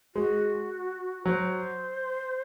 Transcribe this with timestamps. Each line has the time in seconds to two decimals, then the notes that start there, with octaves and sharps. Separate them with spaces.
0.15 G#3 F#4
1.26 F#3 C5